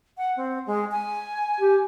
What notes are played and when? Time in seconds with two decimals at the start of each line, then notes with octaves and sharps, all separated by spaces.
0.17 F#5
0.37 C4
0.67 G#3
0.91 G#5
1.60 G4